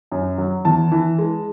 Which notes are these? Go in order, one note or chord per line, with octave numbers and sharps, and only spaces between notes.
F#2
F#3
E2 A5
E3
G#3